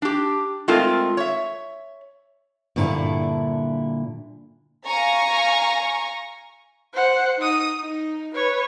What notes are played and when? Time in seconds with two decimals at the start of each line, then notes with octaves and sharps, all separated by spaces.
0.02 D4 G4
0.68 G#3 A3 C4 F4 A#4
1.17 C#5 E5
2.76 G2 A#2 D3 E4 A5
4.85 F5 G#5 A#5 C#6 A#6
6.94 C5 F#5
7.38 D#4 D#6
7.80 D#4
8.34 B4 C#5